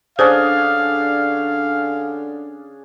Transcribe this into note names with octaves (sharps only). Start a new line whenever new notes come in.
D3 C#4 D4 G#4 C5 F5